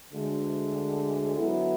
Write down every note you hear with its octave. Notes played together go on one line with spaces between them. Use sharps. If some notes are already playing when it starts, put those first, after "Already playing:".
D2 D3 G#3
D2 D3 F#3 B3 E4